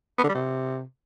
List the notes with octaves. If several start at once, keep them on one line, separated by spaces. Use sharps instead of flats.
B3
D3
G3
C3